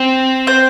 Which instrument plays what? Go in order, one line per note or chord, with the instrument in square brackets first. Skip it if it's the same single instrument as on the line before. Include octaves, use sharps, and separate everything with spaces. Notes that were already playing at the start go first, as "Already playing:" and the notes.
Already playing: [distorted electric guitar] C4
[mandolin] C5